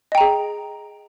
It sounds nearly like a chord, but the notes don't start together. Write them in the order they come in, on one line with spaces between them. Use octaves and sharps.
D#5 G5 A#5 G#4